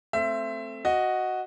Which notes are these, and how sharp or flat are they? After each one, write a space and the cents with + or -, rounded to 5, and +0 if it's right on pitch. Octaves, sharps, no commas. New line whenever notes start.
A3 +0 C4 +0 E5 +25
F#4 +0 D#5 +0